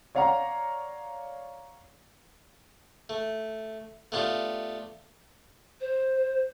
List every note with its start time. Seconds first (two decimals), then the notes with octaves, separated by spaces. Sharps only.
0.15 C#5 D5 F5 F#5 A#5
3.09 A3
4.12 A3 B3 D4 F4 G4
5.80 C5